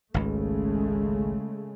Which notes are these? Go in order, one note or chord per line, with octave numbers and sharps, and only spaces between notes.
G#1 C#2 C#3 G#3 A3